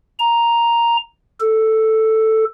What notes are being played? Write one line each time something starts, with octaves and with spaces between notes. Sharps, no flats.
A#5
A4